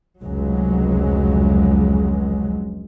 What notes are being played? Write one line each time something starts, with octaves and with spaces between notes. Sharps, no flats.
F1 C#2 F#3 G#3